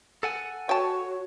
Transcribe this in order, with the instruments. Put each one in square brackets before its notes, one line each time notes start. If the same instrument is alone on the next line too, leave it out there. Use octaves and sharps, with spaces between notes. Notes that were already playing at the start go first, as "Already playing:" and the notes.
[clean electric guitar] A4 F#5 G#5
[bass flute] F#4 [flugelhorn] C#5 [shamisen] G5 A5